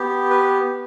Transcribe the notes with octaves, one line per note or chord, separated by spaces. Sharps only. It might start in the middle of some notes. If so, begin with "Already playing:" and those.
Already playing: B3 G4
B4